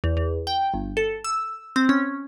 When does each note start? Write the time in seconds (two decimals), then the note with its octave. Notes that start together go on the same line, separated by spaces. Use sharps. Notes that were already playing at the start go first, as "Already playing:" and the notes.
0.04 E2
0.17 E2
0.47 G5
0.74 G1
0.97 A4
1.24 E6
1.76 C4
1.89 C#4